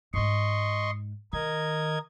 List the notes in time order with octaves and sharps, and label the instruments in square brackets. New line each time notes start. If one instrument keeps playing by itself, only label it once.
[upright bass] G#2 G#3 [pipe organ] D#5 C6 C#6
[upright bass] D#3 [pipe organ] A#4 D#5 G#6